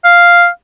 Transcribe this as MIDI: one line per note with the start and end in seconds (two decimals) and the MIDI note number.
0.04 0.47 77